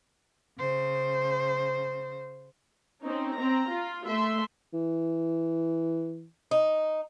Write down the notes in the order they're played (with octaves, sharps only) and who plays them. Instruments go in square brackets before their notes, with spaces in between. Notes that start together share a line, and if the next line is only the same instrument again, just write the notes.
[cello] C#3 C5
[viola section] C4 C#4 D#4
C4 A#5
F4
A3 E5 C6
[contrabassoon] E3
[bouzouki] D#4